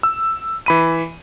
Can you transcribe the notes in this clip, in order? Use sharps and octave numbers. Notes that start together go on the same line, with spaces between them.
E6
E3 B5 D#7